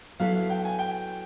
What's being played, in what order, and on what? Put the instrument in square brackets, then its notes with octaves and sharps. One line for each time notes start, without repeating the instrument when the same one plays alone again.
[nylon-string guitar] F#3 B3 E4 A4 [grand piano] F5
[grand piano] F5
G5
G#5
G5